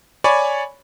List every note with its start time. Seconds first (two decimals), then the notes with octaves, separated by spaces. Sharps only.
0.24 C#5 D5 G#5 B5 C#6